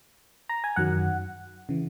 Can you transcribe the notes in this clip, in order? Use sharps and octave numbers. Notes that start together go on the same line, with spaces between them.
A#5
G#5
F#2 D#3 F#3 F#5
C#3 E3